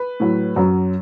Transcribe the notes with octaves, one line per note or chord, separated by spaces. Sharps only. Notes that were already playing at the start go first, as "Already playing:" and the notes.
Already playing: B4
A2 F#3
F#2 F#3